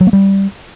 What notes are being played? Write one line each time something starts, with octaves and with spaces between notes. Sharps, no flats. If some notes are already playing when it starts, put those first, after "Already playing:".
F#3
A#3
G3